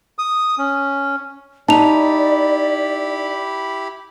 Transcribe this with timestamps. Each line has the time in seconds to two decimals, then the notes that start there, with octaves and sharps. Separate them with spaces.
0.19 D#6
0.58 C#4
1.69 D#4 E4 G4 D5 A5 B5 F7